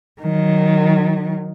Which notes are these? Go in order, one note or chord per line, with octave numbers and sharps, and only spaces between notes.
D#3 F#3